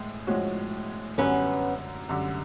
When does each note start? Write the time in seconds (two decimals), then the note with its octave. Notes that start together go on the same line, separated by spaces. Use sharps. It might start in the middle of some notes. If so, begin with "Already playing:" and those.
Already playing: A2 G#3
0.27 A2 F3 G#3 C#4 F#4
1.18 F#2 D3 G3 B3 C#4
2.09 F#2 D3 G3